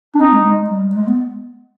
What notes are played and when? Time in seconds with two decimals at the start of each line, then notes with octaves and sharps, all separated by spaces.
0.15 D4
0.20 C4 D#4
0.32 G#3
0.45 G#3
0.70 G3
0.95 G#3
1.07 B3